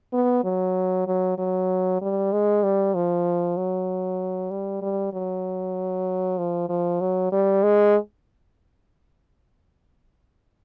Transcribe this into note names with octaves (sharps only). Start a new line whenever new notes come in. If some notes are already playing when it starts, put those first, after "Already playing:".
B3
F#3
F#3
F#3
G3
G#3
G3
F3
F#3
G3
G3
F#3
F3
F3
F#3
G3
G#3